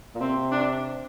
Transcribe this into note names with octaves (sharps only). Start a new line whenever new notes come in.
A#2
C3 C4
D4